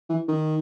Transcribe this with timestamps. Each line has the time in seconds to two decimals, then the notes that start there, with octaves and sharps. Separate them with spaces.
0.09 E3
0.28 D#3